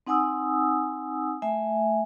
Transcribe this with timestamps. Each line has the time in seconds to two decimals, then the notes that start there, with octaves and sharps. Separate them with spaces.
0.07 C4 D#4 F#5 G#5 D#6 E6
1.42 A3 E5 G#5